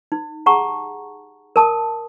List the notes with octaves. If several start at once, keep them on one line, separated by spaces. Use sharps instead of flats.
D#4
G4 G#4 F#5 A5 A#5 C#6
A#4 A5 D#6